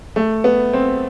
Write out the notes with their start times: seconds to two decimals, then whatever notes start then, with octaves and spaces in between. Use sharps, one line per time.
0.16 A3
0.44 B3
0.73 C4